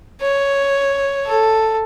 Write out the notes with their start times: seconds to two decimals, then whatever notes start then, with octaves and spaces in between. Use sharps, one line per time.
0.21 C#5
1.26 A4